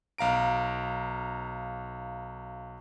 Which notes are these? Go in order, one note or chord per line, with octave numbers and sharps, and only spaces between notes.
B1 F5 A#5 D7